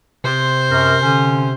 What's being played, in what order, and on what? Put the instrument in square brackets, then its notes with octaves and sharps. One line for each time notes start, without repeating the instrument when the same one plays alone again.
[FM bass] C3 [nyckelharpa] C5
[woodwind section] F#2 A#4
D3 C#4